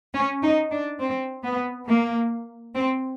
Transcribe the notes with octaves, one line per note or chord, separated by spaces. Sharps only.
C#4
D#4
D4
C4
B3
A#3
C4